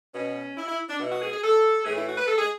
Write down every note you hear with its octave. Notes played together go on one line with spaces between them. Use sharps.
B2 C#4
E4
E4
D4
B2 E4
F#4
G#4
G#4
A4
A2 E3 G#4
E4
F#4
B4
A4
G#4